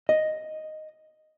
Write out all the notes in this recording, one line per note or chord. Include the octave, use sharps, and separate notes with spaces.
D#5